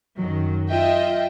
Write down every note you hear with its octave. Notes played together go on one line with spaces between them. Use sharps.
F#2 D#3 F#3
F4 D#5 E5 G5